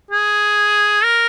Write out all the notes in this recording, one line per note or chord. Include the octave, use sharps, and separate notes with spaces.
G#4
A#4